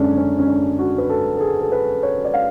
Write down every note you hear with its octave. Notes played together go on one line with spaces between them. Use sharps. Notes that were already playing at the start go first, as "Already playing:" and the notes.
Already playing: F#2 D3 G#3 C#4 D4
C#4
C#4
D4
F#4
B4
A4
A4
G#4
A4
B4
C#5
D5
F5